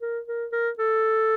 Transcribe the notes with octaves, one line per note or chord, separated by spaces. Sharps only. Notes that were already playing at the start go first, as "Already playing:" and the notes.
A#4
A#4
A#4
A4